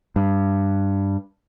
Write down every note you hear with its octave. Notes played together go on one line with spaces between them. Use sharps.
G2